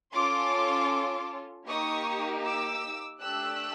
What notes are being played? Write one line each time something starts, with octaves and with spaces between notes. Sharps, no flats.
C#4 F4 A4 C6 D6
A#3 D#4 G4 C#6 D#6
D6 E6
A3 D4 G4 E6 F#6